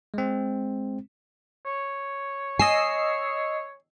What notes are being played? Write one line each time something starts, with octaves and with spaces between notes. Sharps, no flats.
G#3 C4
C#5
D#5 G#5 E6 C7